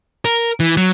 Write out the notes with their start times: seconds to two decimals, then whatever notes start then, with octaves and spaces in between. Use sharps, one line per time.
0.25 A#4
0.60 E3
0.77 F#3